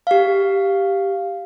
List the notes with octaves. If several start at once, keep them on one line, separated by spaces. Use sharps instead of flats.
G4 F5